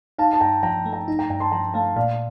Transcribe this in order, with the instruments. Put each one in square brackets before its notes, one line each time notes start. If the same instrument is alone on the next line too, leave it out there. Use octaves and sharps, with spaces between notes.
[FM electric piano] D#4 [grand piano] F5 A5
[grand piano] A5
[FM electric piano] G2 [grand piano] G5 A#5
[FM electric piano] F3 [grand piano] G5 A#5
[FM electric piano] A3
[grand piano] G5 A#5
[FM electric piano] D#4
[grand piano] G5 A#5
[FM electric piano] G2 [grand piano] G5 A#5
[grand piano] A5 C6
[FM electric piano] F3 [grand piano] G5 A#5
[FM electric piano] A3 [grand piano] F5 A5
[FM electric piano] A#2 [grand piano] D5 F5